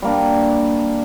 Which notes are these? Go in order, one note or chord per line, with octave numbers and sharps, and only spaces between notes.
G3 A#3 D4